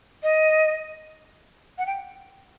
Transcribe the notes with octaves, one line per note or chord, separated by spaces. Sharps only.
D#5
F#5
G5